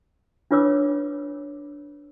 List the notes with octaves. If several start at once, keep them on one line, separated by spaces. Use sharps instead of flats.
D4 F4 B4 C#5 D6 E6